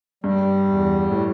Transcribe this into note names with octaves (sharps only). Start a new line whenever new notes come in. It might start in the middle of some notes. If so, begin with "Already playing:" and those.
G2 G3
E2
A2